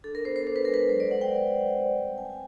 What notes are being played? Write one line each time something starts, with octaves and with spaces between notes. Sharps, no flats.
D4 A4
A#4
B3 C5
C5
D4 C5
B4
G#3 A#4
B4
F#3 C5
D5
F#3 F#5
G5
F#3
F#3
C4
G3
C4 G#5
G#5